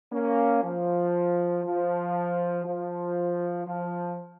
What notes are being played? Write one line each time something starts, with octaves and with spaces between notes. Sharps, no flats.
A#3 C#4
F3
F3
F3
F3